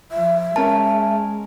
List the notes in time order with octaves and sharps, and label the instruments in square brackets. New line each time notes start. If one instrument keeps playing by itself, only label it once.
[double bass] F3 [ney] E5
[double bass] G#3 [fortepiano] C#4 A#4 [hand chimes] A5